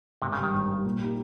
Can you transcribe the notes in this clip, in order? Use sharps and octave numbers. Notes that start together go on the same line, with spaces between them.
G#1 C3
C#3
G2 D#3 G3
G#1
G2
G3
A#2
G3 A#3 D#4 G4